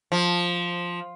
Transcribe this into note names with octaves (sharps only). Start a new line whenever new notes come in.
F3